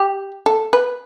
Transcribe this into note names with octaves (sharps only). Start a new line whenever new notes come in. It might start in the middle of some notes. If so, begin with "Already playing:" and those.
Already playing: G4
A4
B4